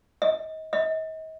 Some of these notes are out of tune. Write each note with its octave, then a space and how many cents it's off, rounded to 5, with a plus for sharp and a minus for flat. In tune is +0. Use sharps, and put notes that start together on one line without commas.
D#5 +30
D#5 +40